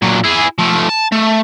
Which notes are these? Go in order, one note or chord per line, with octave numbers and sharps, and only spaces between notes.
A#2 F#3
E4 G#4
F3 A3
A5
A3